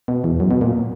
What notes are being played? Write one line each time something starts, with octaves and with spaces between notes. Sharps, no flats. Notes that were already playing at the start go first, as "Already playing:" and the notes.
B2
E2
F#2
B2
A#2